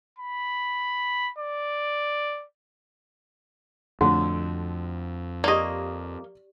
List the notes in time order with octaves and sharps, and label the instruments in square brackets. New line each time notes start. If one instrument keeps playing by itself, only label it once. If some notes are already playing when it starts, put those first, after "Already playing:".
[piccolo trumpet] B5
D5
[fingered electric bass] F2 [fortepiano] A2 D3 [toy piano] F#4
[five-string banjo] A#3 D#5 [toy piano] G4 D5